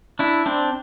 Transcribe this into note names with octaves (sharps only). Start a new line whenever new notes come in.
D4 E4
C4 D4